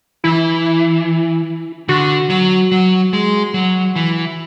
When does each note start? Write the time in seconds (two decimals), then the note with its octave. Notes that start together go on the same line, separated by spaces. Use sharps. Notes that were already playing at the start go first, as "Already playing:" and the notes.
0.24 E3 E4
1.89 D3 F#4
2.30 F#3
2.72 F#3
3.13 G#3
3.54 F#3
3.96 E3